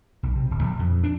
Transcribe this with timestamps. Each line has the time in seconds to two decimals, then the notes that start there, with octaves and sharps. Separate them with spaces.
0.23 B1
0.36 C3
0.51 D1
0.63 A#1
0.79 F2
1.04 D4